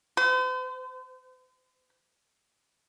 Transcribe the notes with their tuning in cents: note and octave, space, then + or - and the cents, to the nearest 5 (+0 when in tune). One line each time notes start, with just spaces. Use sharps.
C5 -45